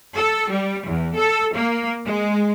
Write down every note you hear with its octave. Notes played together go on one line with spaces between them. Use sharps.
A4
G3
E2
A4
A#3
G#3